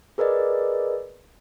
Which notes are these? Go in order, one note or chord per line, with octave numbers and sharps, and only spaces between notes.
G#4 A#4 B4 D5 D#5